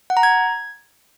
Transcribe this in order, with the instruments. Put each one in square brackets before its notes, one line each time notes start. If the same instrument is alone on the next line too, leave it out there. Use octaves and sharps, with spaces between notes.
[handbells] F#5
A#5
G#6